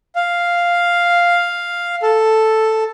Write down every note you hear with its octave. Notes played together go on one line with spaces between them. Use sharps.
F5
A4